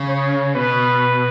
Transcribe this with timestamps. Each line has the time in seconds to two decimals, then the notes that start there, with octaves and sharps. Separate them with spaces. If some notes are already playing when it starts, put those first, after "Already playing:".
Already playing: C#3
0.08 C#5
0.55 B2 B4